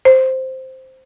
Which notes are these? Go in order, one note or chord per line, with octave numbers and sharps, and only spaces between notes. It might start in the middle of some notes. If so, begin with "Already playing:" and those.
C5